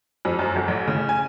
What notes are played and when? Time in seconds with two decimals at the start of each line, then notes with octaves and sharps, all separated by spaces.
0.25 F2
0.39 F#2
0.56 G1
0.68 A1
0.88 C#3
1.09 G#5